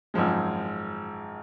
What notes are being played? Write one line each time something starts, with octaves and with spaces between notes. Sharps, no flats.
G#1 F#2 F3 G#3